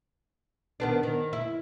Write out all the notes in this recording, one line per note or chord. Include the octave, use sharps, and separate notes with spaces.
D#3 B3 D4
D#3
E4